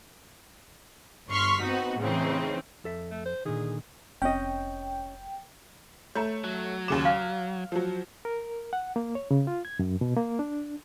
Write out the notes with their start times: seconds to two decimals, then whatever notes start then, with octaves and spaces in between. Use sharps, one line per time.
1.29 G1 C6 C#6 F6 B6
1.61 B3 C4 D#4 F#4
1.98 A2 C#3 E3 C4 D#4
2.84 F2 A4 E5
3.11 A3
3.26 C5
3.45 A#2 D3 D#3 G#4
4.22 F1 C4 C#4 D#5 G5
6.15 A3 C#5 A#5
6.44 F#3
6.88 D#2 C#3 D6 E7
7.05 F5 F6
7.72 F3 F#3
8.25 A#4
8.73 F#5
8.96 A#3
9.15 C#5
9.31 C#3
9.47 F4
9.65 G#6
9.79 F#2
10.01 B2
10.17 A#3
10.39 D4